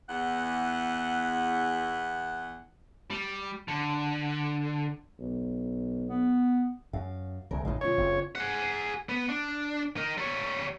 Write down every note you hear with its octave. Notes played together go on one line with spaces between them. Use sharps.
E2 F#5
G3
D3
B1
B3
F#2 F5
C2 C#3 A#4
A1 F#2 C#3 D#4 F5
A#2 C#3 F4 C#5
F#1 C4
G#4 F#5
B3
D4
D#4 A#4
G3 C#5